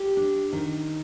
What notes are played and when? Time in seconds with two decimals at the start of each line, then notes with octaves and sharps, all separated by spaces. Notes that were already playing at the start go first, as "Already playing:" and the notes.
Already playing: G4
0.17 D4
0.53 D#3